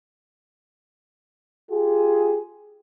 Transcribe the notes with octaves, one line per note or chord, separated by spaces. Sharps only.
F4 G4 G#4